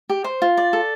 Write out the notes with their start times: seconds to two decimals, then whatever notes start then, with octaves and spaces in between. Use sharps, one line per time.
0.10 G4
0.24 C5
0.42 F4
0.57 D5
0.73 A4